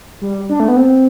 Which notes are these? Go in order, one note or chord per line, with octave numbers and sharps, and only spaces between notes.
G3
D4
A3
B3
C4